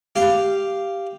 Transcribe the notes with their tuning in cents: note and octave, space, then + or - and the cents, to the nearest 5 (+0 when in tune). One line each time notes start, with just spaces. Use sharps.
G4 +0 F5 -10